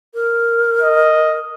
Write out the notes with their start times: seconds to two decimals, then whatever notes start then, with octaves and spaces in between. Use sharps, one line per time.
0.14 A#4
0.81 D#5